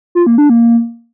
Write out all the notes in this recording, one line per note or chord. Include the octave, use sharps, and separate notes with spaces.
F4
A#3
D4
A#3